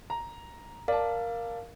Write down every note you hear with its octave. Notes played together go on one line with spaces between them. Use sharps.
A#5
A#4 D5 F5 A5